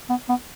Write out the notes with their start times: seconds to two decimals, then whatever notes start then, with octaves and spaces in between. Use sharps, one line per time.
0.09 B3
0.29 B3